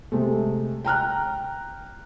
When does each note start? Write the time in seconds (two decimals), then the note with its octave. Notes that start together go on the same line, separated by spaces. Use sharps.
0.12 C3 G#3 A3
0.85 G5 A#5 F6 F#6